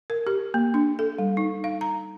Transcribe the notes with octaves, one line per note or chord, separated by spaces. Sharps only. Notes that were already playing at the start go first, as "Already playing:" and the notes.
A#4
G4
A#3
D4
A4
G3
D#4
F5
A#5